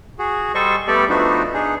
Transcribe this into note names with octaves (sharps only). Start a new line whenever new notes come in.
F#4 G#4
G3 A4 C5 D#5 C#6
G3 A3 B3 G4 A4 D5
F3 A3 B3 D4 D#4 F#4
D4 D#4 G#4